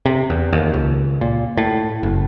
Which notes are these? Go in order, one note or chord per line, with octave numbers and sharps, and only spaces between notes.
C3
E2
D#2
C#2
A#2
A2
F#1